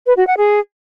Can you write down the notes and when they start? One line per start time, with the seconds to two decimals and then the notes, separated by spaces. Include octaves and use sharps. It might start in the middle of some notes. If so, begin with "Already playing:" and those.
0.07 B4
0.17 F#4
0.27 F#5
0.37 G#4